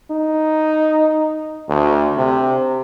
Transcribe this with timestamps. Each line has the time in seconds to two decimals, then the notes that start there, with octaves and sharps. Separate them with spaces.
0.11 D#4
1.69 D2
2.17 C3